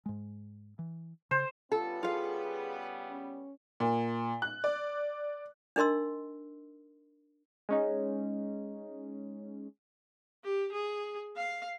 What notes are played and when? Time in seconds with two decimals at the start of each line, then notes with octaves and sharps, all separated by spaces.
0.06 G#2 G#3
0.79 E3
1.31 C#3 C5
1.72 C#3 G3 B3 F4 A4
2.03 F4 G#4 F5
3.10 C#4
3.80 A#2
4.42 F#6
4.64 D5
5.76 D4 D#4 A#4 D#5 C6 E6
7.69 G#3 C#4 D#4
10.44 G4
10.72 G#4
11.36 F5